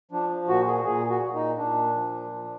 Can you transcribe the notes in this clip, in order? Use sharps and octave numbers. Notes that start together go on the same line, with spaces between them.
F3 D4
A#2 F#4
G#4
A#2 G#4
F#4
A#2
D#4
A#2 D4
F3
F3